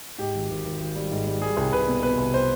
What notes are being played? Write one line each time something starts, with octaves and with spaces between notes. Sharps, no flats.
G#2 G4
G#1
G#1
G#1
G#1
G3
G#2
G3
G3 G#4
C2
C2 B4
B2
B2 B4
C2
C5